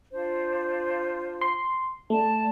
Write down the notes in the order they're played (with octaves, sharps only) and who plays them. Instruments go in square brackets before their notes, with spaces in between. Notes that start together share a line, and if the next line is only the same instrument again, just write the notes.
[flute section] D4 F4 C5
[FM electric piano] C6
[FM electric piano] A3 [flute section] D5 A5